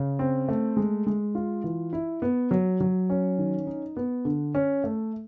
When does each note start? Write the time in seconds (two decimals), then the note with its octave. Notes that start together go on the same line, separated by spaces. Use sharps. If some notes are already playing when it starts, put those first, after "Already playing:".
Already playing: C#3
0.19 C4
0.49 A3
0.77 G#3
1.07 G#3
1.35 F4
1.64 E3
1.93 E4
2.22 B3
2.51 F#3
2.80 F#3
3.10 C#4
3.38 D#3
3.67 D#4
3.97 B3
4.25 D3
4.55 C#4
4.84 A3